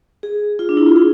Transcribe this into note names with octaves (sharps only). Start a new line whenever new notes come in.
G#4
F4
D4
E4
F4
G#4